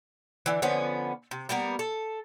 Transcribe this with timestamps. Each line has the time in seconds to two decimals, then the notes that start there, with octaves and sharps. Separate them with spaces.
0.46 D3 E3
0.62 D3 F3 B3 C#4
1.31 C3
1.49 G3 A#3 B3 A#4
1.79 A4